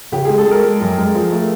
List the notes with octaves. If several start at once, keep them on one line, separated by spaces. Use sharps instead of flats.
C#3 G4
G#4
G#3
A4
G#3 A#4
G#3
F#2
G#3
F3
A3